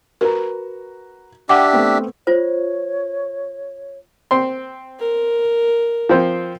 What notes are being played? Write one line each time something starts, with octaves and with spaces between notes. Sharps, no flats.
F#4 A#4 B4 A#5
D4 G4 E5 F#5 G5 D6
A3 B3 C4
F4 C5 C#5
C4 C6
A#4
F3 C4 C5